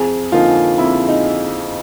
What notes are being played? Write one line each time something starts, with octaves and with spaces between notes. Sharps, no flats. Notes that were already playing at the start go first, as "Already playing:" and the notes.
Already playing: F2 G#4
D3 F3 A#3 D#4 F4
F2 E4
D#4